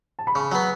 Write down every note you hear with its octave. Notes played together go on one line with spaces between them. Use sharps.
A5
B5
C#3 C#6
F#3 B3